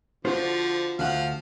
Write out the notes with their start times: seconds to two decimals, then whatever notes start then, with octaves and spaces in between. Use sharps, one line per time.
0.25 D3 F3 F4 F#4 C5
0.99 D2 F3 F5 F#5